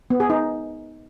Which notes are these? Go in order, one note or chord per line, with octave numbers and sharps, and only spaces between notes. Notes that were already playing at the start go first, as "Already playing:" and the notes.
B3
G#4
D#4